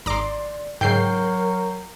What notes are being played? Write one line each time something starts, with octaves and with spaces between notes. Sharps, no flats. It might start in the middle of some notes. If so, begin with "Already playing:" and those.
G#1 D5 A#5 C6 D6
G#2 C#3 F#3 A#4 G5 G6 C7